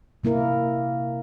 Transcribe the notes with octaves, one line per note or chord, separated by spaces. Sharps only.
C3 A#3 E4 A#4